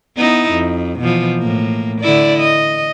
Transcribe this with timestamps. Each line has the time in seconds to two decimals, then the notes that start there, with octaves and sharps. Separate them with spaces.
0.16 B3 D#4 E4
0.52 F2
1.00 B2 E3 F3
1.39 A2 A#3
2.01 D3 E4 D5
2.39 D#5